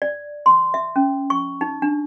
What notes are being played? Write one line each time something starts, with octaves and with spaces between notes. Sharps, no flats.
D5
C6
E5
C#4
C#6
D#4
D4